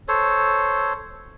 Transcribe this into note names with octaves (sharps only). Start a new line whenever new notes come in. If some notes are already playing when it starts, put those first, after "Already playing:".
A4 C5 C#5